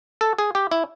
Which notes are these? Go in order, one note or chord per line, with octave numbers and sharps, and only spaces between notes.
A4
G#4
G4
E4